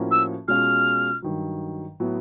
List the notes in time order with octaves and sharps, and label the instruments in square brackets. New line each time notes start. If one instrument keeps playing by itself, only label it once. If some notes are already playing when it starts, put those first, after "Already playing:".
Already playing: [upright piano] A2 F3 A#3 C#4 F#4
[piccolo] E6
[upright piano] B2 G#3 C#4 F4 [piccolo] F6
[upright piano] G2 D#3 F#3
A2 F#3 B3